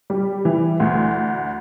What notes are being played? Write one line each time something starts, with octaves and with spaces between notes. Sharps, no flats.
G3
E3
D2